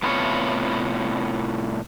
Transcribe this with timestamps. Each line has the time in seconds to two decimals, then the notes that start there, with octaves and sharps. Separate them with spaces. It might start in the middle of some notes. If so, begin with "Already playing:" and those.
0.03 A2 C3 B3 E4 F4 C#5